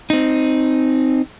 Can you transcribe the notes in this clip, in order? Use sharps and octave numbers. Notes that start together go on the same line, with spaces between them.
C4 D#4